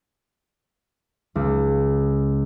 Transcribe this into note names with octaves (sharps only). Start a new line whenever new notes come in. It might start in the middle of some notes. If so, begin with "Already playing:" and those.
C#2